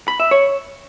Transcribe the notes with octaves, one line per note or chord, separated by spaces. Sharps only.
B5
E5
C#5